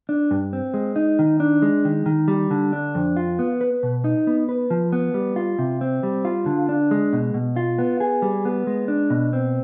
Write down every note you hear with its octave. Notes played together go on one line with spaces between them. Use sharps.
D4
G2
C4
G#3
D#4
D#3
D4
G#3
D#3
D#3
G3
D3
D4
F2
F4
B3
B4
B2
D#4
B3
B4
F3
B3
G3
F4
C3
C4
G3
F4
D3
D4
G#3
B2
B2
F4
B3
G#4
G3
B3
G#3
D4
B2
C4